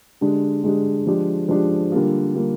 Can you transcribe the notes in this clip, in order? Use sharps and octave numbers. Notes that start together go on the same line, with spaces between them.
D3 G#3 D4 G4
D3 G#3 D4 G4
F3 G#3 D4 G4
F3 G#3 D4 G4
D3 G3 A#3 F4
D3 G3 A#3 F4